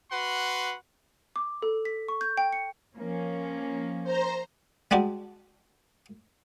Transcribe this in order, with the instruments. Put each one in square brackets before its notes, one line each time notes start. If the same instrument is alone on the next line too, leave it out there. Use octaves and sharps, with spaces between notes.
[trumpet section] F#4 B4 F#5 C6
[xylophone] D6
A4
B6
C#6
G6
G5
C#7
[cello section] F3 A#3 C#4
[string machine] C5 A#5
[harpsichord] G3 G#3 D4 F#4 G4